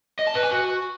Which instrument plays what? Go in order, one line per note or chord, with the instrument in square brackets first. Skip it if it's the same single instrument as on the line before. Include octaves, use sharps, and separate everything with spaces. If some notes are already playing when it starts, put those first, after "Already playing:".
[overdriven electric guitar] D#5
A5
B4
G#5
F#4